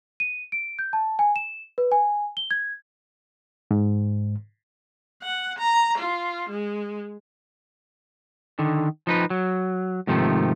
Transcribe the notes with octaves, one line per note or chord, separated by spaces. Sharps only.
D#7
D7
G6
A5
G#5
E7
B4
G#5
G7
G#6
G#2
F#5
A#5
F4
G#3
D3 D#3
F3 D#4 B4
F#3
G#2 C3 D#3 F3 A3